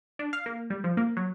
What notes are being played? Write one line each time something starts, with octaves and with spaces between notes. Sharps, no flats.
D4
F5
A#3
G3
F3
A#3
F#3